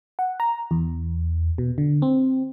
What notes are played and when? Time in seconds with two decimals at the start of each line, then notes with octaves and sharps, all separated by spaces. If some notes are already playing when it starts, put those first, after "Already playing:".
0.19 F#5
0.40 A#5
0.71 E2
1.58 B2
1.78 D3
2.02 C4